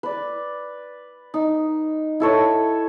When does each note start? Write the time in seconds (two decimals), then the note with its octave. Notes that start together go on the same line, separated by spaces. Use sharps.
0.03 B4 D5
1.34 D#4
2.20 E4 A4 C#5